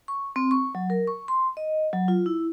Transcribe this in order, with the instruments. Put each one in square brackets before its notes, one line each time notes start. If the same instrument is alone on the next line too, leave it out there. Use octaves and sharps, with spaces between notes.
[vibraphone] C#6
C4
C#6
F#3
A#4
C#6
C6
D#5
F#3
F4
E4